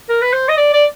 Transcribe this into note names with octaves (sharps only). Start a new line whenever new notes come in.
A#4
B4
C5
D#5
D5
D5